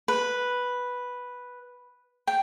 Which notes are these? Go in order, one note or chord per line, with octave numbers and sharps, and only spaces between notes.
B4
G5